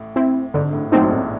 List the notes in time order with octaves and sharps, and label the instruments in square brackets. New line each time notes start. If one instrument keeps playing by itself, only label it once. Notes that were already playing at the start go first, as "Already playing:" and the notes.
Already playing: [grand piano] A1 A2
[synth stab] C4 E4
[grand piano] G#1 G#2 [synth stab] D3
[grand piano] A1 A2
[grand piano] A#1 A#2 [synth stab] F#3 A3 C4 D#4
[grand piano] G#2
A1 A2